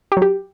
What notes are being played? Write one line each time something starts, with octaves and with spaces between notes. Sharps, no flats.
G4
F#3
G4